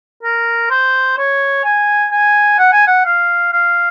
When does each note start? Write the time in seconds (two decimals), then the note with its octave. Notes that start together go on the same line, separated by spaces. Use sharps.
0.23 A#4
0.70 C5
1.18 C#5
1.64 G#5
2.12 G#5
2.58 F#5
2.73 G#5
2.87 F#5
3.05 F5
3.53 F5